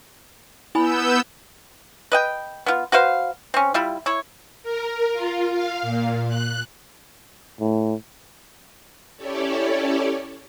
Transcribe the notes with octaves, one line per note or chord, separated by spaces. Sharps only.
B3 E4 G#5 B5 E6 G6
B4 D#5 G5
B3 F4
F#4 B4 C5 F5
C4 C#4
G3 E4 F4
E4 C#5
A#4
F4
F5
A#2
F#6
A2
C#4 E4 G4 A4 C#5 D5